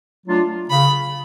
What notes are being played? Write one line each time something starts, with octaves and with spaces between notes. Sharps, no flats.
F#3 A3 D4 F4
C#3 B5